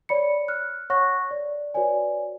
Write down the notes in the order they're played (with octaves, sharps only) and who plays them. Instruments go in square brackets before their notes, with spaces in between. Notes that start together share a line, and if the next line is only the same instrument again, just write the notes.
[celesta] C#5 D5 B5 C#7
F6 F#6
C#5 F#5 C#6 F#6 A#6
D5
F#4 B4 C#5 D5 G#5